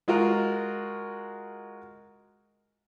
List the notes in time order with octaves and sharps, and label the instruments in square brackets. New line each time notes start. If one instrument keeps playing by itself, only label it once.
[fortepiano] G#3 F4 F#4 A#4